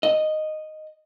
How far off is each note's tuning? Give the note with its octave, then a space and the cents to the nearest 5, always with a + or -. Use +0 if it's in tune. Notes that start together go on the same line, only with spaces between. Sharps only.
D#5 -5